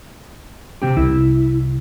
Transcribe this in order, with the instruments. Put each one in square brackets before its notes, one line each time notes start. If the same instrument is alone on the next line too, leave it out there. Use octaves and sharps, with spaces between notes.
[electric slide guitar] C3 C4 G4
[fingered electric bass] C2 [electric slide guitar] E4